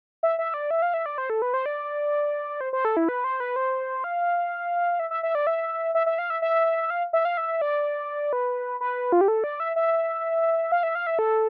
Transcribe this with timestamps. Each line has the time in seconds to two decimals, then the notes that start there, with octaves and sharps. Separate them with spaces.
0.23 E5
0.39 E5
0.54 D5
0.71 E5
0.82 F5
0.94 E5
1.06 D5
1.18 C5
1.30 A4
1.42 B4
1.54 C5
1.66 D5
2.61 C5
2.73 C5
2.85 A4
2.97 E4
3.09 B4
3.24 C5
3.40 B4
3.56 C5
4.04 F5
5.00 E5
5.11 E5
5.23 E5
5.35 D5
5.47 E5
5.95 E5
6.06 E5
6.19 F5
6.30 E5
6.42 E5
6.90 F5
7.13 E5
7.25 F5
7.37 E5
7.61 D5
8.33 B4
8.81 B4
9.12 F4
9.21 G4
9.28 A4
9.44 D5
9.60 E5
9.76 E5
10.72 F5
10.83 E5
10.95 F5
11.07 E5
11.19 A4